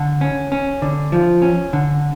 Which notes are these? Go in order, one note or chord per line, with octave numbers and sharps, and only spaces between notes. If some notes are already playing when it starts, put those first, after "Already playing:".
Already playing: D3
C#4
C#4
D3
F3
C#4
D3